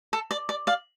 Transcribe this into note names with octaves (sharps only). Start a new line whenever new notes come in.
A4
D5
D5
D5 F5